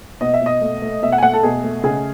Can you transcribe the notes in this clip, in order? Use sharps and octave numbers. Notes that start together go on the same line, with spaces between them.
B2 D#5
E5
B2 D#5
A3
A3
B2 E5
F#5
G#5
A3 F#5
A4
B2 G#4
A3
C#3 G#4